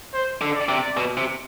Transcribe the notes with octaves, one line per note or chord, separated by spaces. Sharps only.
C5
D3
D5
C3
B2
C3